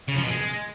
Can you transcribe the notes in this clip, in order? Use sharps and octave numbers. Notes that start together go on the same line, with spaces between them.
C#3
F3
B2
G#3